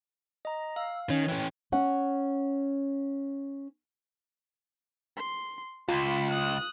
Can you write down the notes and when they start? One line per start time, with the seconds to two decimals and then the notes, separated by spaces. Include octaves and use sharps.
0.45 D#5 A#5
0.76 F5 E6
1.10 D#3 C#4 C#5
1.28 E3 C#4 G5
1.72 C#4 F#5
5.17 C6
5.89 C#2 F4 B5 C6
6.31 D#6 F#6